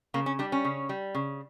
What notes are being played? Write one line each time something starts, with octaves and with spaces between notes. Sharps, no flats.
C#3 A#3
C#4
G3 D4
C#4
C#3
G3
C#3